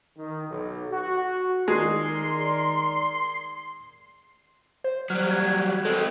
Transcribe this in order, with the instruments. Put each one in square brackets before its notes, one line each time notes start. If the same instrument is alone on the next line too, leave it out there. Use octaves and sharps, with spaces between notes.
[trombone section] D#3
B1
F#4
[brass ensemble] D#3 A#4 D5 [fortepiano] G#3 [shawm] C6
[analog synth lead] C5
[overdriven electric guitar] F#3 G3 [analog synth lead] F6
[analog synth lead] G#6
[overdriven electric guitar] G#3 C4 [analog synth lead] A4